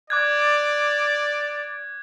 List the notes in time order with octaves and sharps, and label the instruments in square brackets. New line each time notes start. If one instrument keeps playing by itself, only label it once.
[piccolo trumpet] D5 [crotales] D6 F#6 G#6